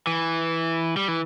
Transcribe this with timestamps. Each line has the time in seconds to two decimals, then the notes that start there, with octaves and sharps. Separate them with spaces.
0.07 E3
0.97 G3
1.08 E3